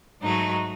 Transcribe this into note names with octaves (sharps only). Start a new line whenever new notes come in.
G#2 F#3 A3 D#4